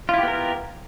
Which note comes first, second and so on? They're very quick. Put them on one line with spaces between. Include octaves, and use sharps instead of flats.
F4 E4 G4 B3 A#4